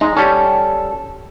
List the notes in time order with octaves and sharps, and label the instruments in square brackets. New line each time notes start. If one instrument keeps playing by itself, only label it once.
[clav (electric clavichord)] G#3 [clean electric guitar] D#4
[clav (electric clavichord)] G3 C#4 [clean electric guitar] A4